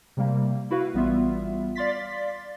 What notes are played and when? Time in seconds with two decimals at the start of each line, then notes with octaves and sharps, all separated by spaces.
0.17 C3 G3 A#3
0.70 E4 F#4 B4 F5
0.94 A1 G3 B3 F4 E5
1.75 D5 F5 C6 A6 B6